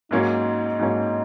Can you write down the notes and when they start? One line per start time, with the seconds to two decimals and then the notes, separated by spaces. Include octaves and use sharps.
0.11 G#2 F#3 A#3 C#4 D#4
0.79 G#2 F#3 A#3 C#4